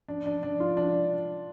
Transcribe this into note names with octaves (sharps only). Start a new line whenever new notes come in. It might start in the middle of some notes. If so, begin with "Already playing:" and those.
D4
D4
D4
F4
D4